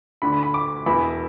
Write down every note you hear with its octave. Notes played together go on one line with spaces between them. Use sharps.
D2 D3 B5
B5
B5
D6
E1 E2 E3 B5